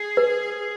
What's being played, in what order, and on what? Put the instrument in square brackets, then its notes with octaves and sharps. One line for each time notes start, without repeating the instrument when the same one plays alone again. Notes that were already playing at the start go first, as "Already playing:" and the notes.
Already playing: [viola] G#4
[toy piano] B4